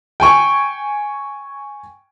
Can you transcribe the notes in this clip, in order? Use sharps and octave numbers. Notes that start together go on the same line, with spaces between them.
G5 G#5 C#6